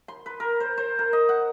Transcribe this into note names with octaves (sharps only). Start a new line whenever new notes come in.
C6
B4
A#4
C5
C5
A#4
D#5
F#5